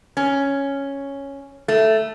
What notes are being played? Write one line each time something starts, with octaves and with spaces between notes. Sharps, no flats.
C#4
A3